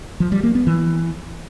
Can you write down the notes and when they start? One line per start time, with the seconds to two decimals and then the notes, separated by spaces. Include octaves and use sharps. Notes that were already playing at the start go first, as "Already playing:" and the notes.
0.20 F3
0.32 G3
0.43 A#3
0.55 B3
0.67 E3